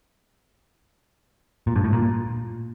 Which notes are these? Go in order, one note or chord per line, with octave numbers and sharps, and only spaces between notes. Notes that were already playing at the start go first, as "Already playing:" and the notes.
A#2
G2
A2
A#2